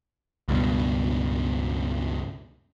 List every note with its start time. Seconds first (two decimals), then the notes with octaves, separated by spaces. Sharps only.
0.48 C#2 G2 B2